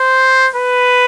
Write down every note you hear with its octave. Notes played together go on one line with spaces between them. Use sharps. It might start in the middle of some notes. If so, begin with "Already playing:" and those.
Already playing: C5
B4